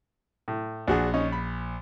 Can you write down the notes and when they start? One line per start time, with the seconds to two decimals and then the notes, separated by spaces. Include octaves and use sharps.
0.48 A2
0.88 A#1 D4 F#4 G#4
1.14 C#4 D#4 D#5
1.32 B5